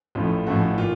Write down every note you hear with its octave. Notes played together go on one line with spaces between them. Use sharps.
A1 A2 F3 A3 F4
A1 A2 F3 A3 F#4
A#2 F4